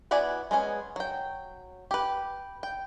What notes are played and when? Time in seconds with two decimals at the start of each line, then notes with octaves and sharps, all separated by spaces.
0.11 B3 E4 F#4 D5 G#5
0.51 G#3 B3 C#4 G#4
0.96 F#3 G5
1.91 G4 B4
2.63 G5